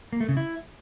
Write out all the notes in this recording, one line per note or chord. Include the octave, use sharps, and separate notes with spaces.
A#3
A3
C#3
E4